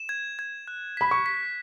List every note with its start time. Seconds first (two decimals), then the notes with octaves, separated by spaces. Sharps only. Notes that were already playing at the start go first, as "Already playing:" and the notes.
Already playing: E7
0.09 G#6
0.39 G#6
0.68 F#6
0.97 B5 B6
1.11 C#6
1.26 B6